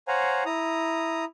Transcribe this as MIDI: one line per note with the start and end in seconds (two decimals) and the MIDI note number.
0.08 0.43 72
0.08 0.43 73
0.08 0.43 77
0.08 0.43 78
0.08 0.43 80
0.08 0.43 82
0.46 1.25 64
0.46 1.25 82
0.46 1.25 87